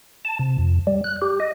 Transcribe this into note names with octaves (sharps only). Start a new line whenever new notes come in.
A5
C3
F2
G3
F#6
G4
D#5